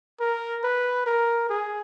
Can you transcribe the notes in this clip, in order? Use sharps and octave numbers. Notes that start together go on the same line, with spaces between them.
A#4
B4
A#4
G#4